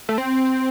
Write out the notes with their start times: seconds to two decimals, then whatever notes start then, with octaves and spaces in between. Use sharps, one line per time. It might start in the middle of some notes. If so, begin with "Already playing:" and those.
0.09 A3
0.18 C4